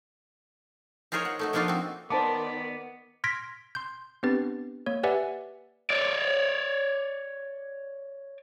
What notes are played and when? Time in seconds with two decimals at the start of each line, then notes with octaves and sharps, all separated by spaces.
1.12 D#4 F4 G#4 A#4 C5 C#5
1.25 F#5
1.39 A3 D#4 F#4
1.53 F3 A#3 D4 D#4 F4 F#4
1.68 C4 F#4
2.10 D#3 B3 C5 D5 A5 D6
3.24 C6 F6 G#6 A#6 B6 D7
3.75 C6 G6
4.23 B3 C4 D4 G4 B4 A6
4.86 A#3 C#5
5.03 G4 B4 D5 E5 F#5 G#5
5.90 C#5 D5